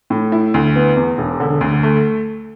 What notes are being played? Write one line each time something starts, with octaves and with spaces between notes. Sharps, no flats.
A2
E4
D2
B3
E2
E1
D3
D2
A3